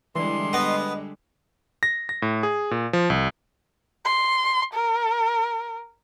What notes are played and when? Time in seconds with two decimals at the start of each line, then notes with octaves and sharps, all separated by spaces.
0.15 D3 E3 G3 G#3 C6
0.53 B3 D#5
1.83 A#6
2.09 A#6
2.22 A2
2.43 G#4
2.71 A#2
2.93 F3
3.10 C2
4.05 C6
4.74 A#4